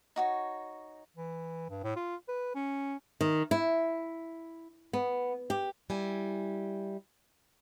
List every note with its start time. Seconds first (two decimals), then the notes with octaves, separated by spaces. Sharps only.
0.16 D#4 F#4 C#5
1.16 E3
1.70 G2
1.84 A2
1.96 F4
2.28 B4
2.55 C#4
3.21 D#3
3.51 E4
4.93 B3
5.50 G4
5.90 G3 E4 G#5